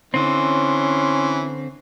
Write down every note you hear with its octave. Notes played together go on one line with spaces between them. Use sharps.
D3 E3 C4 C#4 C6